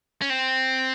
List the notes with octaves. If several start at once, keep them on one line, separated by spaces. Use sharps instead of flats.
C#4
C4